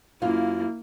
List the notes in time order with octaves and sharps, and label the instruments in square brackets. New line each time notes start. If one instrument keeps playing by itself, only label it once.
[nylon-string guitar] F#2 F4 F5 [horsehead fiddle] A#3 E4